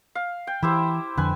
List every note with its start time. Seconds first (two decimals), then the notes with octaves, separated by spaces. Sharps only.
0.15 F5
0.47 G5
0.63 E3 E4 G4 C5 E5
1.17 F2 D3 B4 G#5